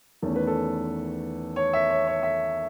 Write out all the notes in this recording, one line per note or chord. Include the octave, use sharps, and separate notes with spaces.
E2 D#3 A3 C#4 A4
B4
A4
C#5
E5
C#5
C#5
E5